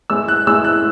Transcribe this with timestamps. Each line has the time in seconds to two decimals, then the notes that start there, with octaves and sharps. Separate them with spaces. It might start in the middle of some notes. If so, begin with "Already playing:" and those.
0.10 A2 G#3 C#4 E4 E6
0.28 F#6
0.46 A2 G#3 C#4 E4 E6
0.64 F#6